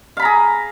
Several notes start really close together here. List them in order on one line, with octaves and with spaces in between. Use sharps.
F5 B5 A#5 G#4